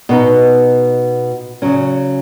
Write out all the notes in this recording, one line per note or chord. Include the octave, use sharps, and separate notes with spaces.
B2 B3 D#4
C#3 F#3 C#4